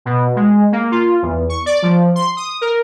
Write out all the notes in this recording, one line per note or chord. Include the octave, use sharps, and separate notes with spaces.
B2
G#3
A#3
F4
E2
C#6
D5
F3
C6
D#6
A#4